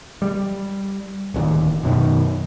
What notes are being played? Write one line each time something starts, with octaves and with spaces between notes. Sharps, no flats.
G3
D1 A1 D#2
F#2 B2 D#3